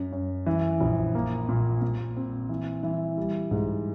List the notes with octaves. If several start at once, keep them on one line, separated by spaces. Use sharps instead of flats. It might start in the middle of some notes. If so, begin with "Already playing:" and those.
Already playing: F#2
F#2
E3
A#1
A#3
A#2
A#2
C4
E3
E3
G3
G#2